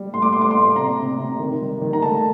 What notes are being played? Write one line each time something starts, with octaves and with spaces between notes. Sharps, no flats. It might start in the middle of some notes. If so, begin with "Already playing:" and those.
Already playing: G3
A2 C6
D6
A3 C6
D6
C6
A2
C3 A#5
C3
C3
D#3
G3
D#3
A#5
A3 A5